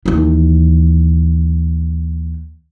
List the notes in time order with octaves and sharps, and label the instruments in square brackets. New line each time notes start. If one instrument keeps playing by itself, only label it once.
[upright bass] D#2 E3